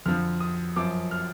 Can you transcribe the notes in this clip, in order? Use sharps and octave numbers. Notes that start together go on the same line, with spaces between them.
F2 D3 F3 F6
D#6
F#2 F3 D6
F6